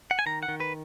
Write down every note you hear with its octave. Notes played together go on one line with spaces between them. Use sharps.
F#5
G#5
D#3 A#5
F#5
D#3
B4